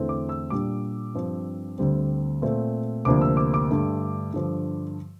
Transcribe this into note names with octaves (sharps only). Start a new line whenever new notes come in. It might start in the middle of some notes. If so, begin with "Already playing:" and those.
Already playing: E2 D3 A3 C4
D6
E6
A#2 G3 D4 D6
G2 F3 C4
D2 D3 G3 C4
A#2 A3 C4
D2 C3 F3 A#3 D4 D6
E6
D6
D6
G2 D3 A3 D4
G2 D3 F3